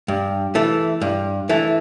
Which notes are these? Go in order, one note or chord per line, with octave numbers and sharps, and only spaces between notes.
G2
E3 A3
G2
E3 A3